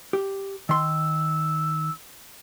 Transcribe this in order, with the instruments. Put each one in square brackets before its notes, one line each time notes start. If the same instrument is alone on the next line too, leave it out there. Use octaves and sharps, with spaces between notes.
[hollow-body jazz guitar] G4
[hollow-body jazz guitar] D#3 C6 [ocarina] E6